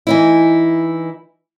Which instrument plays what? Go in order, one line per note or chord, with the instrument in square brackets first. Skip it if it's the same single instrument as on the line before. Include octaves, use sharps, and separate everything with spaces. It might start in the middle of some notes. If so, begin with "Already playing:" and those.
[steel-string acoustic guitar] E3 D#4 E4